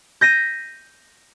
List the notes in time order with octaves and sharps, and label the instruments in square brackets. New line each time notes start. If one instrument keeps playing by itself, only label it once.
[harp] G6 A#6 B6 D#7